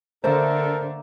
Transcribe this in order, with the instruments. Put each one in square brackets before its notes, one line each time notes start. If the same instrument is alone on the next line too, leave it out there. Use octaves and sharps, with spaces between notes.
[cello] D3 [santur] A3 A#3 A5 [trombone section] D4 A4 A#4 [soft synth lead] C5